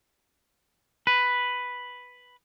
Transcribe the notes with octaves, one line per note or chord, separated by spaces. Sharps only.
B4